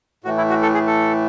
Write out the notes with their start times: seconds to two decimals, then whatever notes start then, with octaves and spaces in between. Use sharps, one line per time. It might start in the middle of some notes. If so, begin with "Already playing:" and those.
0.24 A2 E3 A3 F#4
0.38 E4
0.50 F#4
0.62 A4
0.74 G#4
0.87 A4